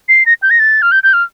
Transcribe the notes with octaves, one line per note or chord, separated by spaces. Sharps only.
C7
A#6
G6
A#6
A6
F6
G6
G6
F6